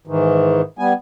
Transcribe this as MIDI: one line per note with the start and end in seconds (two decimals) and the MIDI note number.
0.07 0.61 44
0.07 0.61 51
0.07 0.61 52
0.79 0.93 55
0.79 0.93 59
0.79 0.93 80